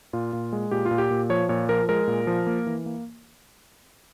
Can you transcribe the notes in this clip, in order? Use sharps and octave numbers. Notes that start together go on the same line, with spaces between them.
A#2 F4
A#2
G#3
A#2 G4
F4
A#2
G4
A#2
F3 C#5
A#2 C#5
F3 A#4
G#3 A#4
A#2
F3
A#3
E3
A#3